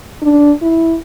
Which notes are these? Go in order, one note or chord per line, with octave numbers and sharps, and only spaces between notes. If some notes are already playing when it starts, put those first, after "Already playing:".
D4
E4